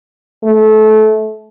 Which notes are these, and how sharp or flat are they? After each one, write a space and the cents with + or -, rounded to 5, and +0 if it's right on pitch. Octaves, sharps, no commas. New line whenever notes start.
A3 -25